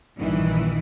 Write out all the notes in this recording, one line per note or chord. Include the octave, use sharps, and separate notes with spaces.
A#1 G2 D#3 E3